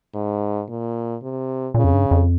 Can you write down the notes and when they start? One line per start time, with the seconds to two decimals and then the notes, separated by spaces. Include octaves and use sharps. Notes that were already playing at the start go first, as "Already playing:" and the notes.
0.14 G#2
0.69 A#2
1.22 C3
1.74 A#2 C#3
1.84 F2
1.93 G2
2.11 F2